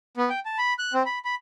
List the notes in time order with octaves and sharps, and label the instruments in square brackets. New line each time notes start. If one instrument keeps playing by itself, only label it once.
[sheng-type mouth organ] B3
G5
A5
B5
F#6
C4
B5
B5